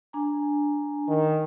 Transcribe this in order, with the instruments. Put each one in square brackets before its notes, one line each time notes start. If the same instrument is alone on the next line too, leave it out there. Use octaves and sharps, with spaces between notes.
[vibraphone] D4 G#5 A#5
[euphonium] D#3